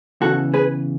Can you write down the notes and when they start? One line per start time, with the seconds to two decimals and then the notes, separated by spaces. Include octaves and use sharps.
0.21 E2 C#3 E3 F#4 A4
0.54 G#4 B4